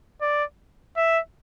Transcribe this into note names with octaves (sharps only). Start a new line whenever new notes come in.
D5
E5